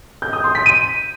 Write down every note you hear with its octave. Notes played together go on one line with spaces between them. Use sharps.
G6
D#6
C6
B6
D#7